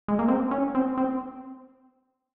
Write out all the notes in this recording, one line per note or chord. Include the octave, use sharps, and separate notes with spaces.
G#3
A#3
C4
C#4
C4
C4